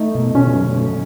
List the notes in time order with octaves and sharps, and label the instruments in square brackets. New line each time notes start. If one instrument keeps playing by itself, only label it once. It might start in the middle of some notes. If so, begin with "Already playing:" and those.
Already playing: [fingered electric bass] A3 [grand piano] D#4
[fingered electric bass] B2
[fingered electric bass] B2 [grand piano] C#4
[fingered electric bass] F#3
A3